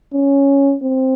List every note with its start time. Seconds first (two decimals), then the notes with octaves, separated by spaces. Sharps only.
0.14 C#4
0.83 C4